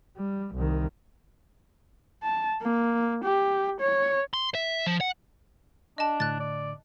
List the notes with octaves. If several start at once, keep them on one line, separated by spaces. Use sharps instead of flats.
G3
C2 D#3
A5
A#3
G4
C#5
C6
E5
F3
F#5
D4 D#5 A5
A2 D3 F#6 A6
D5